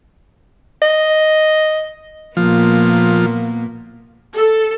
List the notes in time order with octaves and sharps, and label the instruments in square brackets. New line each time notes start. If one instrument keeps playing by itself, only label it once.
[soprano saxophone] D#5
[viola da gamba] A#2 A#3 B3 [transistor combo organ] F3
[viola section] A4